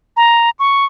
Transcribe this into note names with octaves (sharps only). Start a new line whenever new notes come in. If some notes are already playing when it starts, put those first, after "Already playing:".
A#5
C#6